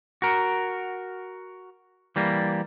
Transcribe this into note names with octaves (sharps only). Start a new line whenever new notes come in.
F#4 A#4
E3 G3 A#3